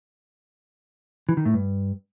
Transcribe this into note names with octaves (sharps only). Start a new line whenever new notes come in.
E3
D#3
A2
G2